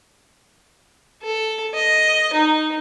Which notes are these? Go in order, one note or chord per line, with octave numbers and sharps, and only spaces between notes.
A4
D#5
D#4